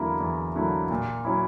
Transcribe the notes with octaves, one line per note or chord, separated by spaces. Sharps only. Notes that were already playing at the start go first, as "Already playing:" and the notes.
Already playing: E2 D3 F#3 A#3 E4
E2
D3 F#3 A#3 E4
A#2
F#3 C#4 E4